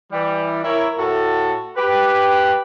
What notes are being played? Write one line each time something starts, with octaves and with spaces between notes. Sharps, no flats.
E3 G3
E4 A#4 C#5
A2 F#4 A4
G4 B4